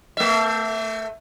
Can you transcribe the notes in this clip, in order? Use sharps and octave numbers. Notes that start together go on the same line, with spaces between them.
A3 E5